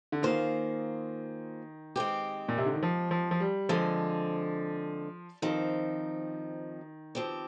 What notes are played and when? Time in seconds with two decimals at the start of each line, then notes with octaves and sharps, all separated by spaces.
0.12 D3
0.22 D#3 A#3 F4 G#4 C5
1.96 G#3 C4 G4
2.49 A#2
2.58 C3
2.66 D3
2.74 D#3
2.82 F3
3.11 F3
3.31 F3
3.40 G3
3.69 D3 F3 G#3 C4
5.42 D#3 F3 C4 D#4
7.15 F3 C4 G4